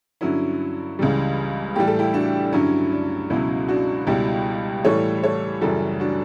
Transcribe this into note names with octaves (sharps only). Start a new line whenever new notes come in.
G2 D3 F#3 C#4 E4
C#2 C#3 E3 G3
A2 E3 G3 G4
A4
E4 G4
D4 F#4
D4
G2 D3 F#3 C#4 E4
D4
C#2 B2 F#3 C#4 E4
D4 F#4
C#2 B2 G3 E4 G4
A2 E3 G3 A4 C#5
A4 C#5
F#2 C#3 E3 G3 F#4 A4
D4 F#4